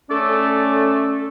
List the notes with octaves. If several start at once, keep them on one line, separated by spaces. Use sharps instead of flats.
A3 C#4 A4 D5